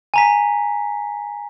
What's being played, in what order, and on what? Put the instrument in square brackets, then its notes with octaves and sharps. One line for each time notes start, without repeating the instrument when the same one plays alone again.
[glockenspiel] G#5 A#5 B6